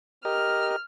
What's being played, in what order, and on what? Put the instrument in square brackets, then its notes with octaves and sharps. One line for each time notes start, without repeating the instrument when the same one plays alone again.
[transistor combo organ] G4 A#4 D#5 [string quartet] F6